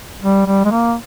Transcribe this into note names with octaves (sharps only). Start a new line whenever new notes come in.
G3
G3
G#3
A#3